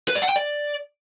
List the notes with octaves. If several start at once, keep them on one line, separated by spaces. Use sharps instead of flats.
B4
D5
F#5
G5
D5